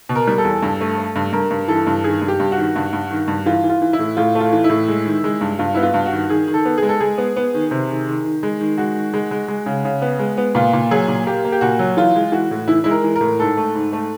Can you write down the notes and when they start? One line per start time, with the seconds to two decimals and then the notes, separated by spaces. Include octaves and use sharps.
0.09 B2
0.15 A#4
0.27 G3
0.38 A4
0.45 E2
0.63 G2
0.81 A3
0.98 A3
1.16 G2
1.33 G2 A#4
1.51 G2
1.68 E3 A4
1.87 G2
2.04 D#3 G#4
2.22 G2
2.28 G4
2.40 G2
2.52 F#4
2.58 D#3
2.76 G2
2.93 G2
3.11 D#3
3.28 G2
3.46 E3 F4
3.64 E3
3.70 F4
3.82 E3
3.93 E4
3.99 A2
4.17 A2 F4
4.35 A3
4.40 F4
4.52 E3
4.64 E4
4.70 A2
4.88 G#3
5.06 D#3
5.24 G#3
5.41 G2
5.59 G2 F4
5.74 B3 E4
5.83 F4
5.94 G2
6.06 F#4
6.12 D#3
6.29 D#3 G#4
6.48 D#3
6.54 A4
6.65 B3
6.78 G#3 G#4
6.89 A4
7.00 G#3 G#4
7.18 B3
7.36 B3
7.54 D#3
7.71 C3
7.89 D#3
8.07 D#3
8.25 D#3
8.43 G#3
8.61 D#3
8.78 G#3 F#4
8.95 D#3
9.14 G#3
9.31 G#3
9.48 G#3
9.66 C#3
9.85 C#3
10.02 B3
10.19 G#3
10.38 B3
10.55 A#2 F4
10.73 A#2
10.91 F#3 G#4
11.08 A#2
11.27 A#3 G4
11.45 A#3
11.52 G4
11.61 A#2 F#4
11.79 F#3
11.97 E3 F4
12.15 G#3
12.32 E3 F#4
12.51 A2
12.68 E3 E4
12.84 G#3 E4
12.91 A#4
13.04 E3
13.16 A#4
13.21 A2
13.39 G#2 A4
13.57 A3
13.75 G#2
13.93 A3